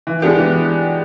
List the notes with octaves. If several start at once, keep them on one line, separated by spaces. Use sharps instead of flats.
E3
G#3 B3 D4 G4
E3